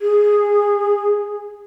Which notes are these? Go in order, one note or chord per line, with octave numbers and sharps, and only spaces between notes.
G#4